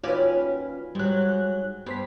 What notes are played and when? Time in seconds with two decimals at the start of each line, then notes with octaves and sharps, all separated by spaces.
0.03 D#2 C#4 F4 F#4 B4 D5
0.95 G#2 F#3 G3 F#6
1.86 G2 B3 C5 B6